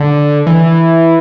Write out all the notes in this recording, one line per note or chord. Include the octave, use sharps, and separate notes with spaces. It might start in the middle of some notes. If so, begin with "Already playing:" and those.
Already playing: D3
E3